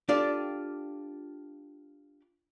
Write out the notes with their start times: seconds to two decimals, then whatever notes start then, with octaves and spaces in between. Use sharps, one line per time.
0.09 D4 F4 G4 A4 D5